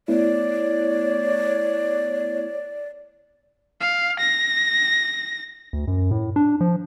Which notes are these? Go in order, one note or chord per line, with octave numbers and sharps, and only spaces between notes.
A3 B3 E4 C#5 D5
F5
A#6
D2
F#2
A2
D4
F3